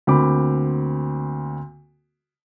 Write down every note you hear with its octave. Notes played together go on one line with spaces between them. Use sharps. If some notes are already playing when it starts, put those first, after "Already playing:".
D2 A#3 C4 B5 D6